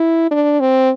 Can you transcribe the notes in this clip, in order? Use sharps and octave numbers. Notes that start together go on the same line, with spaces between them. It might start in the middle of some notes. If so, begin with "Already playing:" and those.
Already playing: E4
D4
C4